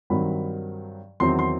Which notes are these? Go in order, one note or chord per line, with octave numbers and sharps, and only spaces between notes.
G2 D#3 F#3 C4 B5
E2 D#3 F#3 C4 C6
C6